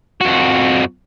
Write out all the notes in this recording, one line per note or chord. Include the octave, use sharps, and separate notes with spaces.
F2 F#4